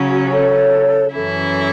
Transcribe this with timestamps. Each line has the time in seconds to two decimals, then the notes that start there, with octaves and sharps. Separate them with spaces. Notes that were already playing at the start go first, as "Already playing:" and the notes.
Already playing: C#3 F#3 C#4
0.10 F#4
0.32 A4 C#5
1.13 F#2 E3 C#4 E4 A4